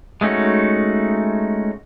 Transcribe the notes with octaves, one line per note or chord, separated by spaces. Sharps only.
G#3 A3 C#4 D#4 F#4